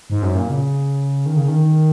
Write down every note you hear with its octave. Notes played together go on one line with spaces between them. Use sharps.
G#2
F#2
A#2
C#3
D#3
C#3
D#3